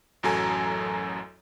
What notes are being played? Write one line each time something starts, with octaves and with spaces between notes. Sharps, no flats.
A1 F#2 F#3 A4 G#5 A#5